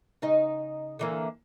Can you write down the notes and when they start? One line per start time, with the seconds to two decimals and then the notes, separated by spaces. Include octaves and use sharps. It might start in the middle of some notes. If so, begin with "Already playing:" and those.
0.22 C#3 D#4 D#5
0.99 D3 E3 A#3